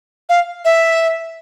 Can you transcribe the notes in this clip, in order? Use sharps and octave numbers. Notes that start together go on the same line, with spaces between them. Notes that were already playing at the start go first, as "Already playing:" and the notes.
F5
E5